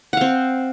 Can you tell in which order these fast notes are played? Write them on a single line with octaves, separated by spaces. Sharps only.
F#5 F5 C4